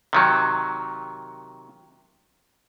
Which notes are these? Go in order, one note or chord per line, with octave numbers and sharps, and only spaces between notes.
C3 D#3 F#3